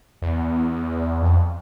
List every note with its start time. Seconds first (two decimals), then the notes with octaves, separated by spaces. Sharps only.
0.22 E2
1.21 F2